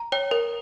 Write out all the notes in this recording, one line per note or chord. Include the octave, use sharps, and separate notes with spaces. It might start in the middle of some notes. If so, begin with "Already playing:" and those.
Already playing: A#5
C#5 G5
A#4